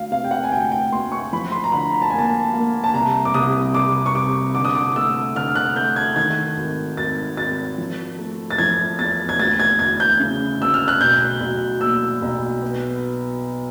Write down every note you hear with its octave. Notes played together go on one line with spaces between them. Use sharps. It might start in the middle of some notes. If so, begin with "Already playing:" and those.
Already playing: D2 F5
C3 F5
G5
F#5
G#5
D2 G5
G5
D2 C6
C#6
F3 B5
C6
A#5
D3 B5
A#5
A5
A#3 G#5
A5
A#3
A5
C2 A#5
D6
C2 D#6
C2 D6
C#6
C3 D6
D3 D6
D#6
D6
A3 E6
D3 F6
F#6
A3 G6
G#6
D#3 G#6
G#1
G#1 A6
G#1 A6
F3
A3
A6
F3 G#6
E2 A6
G#6
D2 A6
G#6
D2 G#6
G6
C#3
D2 E6
F6
F#6
B1 G6
B1
A#2 E6
B1
B3